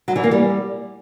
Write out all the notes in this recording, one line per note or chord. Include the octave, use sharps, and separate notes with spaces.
F#3
E3
A#3
G3